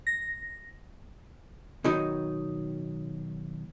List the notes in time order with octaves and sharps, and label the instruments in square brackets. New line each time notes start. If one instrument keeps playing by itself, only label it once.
[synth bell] A#6
[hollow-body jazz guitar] B2 D#3 F#3 D#4